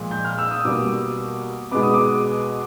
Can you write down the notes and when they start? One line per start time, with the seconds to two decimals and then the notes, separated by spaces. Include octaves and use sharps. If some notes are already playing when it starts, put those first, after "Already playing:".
Already playing: A#2 F3 G#3
0.11 G6
0.25 F6
0.38 E6
0.51 D#6
0.65 B2 G3 A#3 D6
1.71 B2 G#3 B3 D6
1.83 D#6
1.94 D6